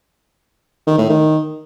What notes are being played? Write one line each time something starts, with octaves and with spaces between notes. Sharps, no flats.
D#3
A2
D#3